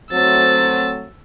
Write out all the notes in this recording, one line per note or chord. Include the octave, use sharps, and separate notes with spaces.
F#3 A3 C4 E6 A6